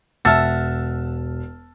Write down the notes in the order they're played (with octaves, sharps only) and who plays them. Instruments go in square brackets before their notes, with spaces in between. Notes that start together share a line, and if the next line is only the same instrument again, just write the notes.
[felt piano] E1 F6 [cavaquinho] E5 F#5 [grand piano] A5 E6 A6